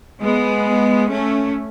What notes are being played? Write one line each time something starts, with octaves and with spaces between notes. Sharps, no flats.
G#3 B3
A3 C#4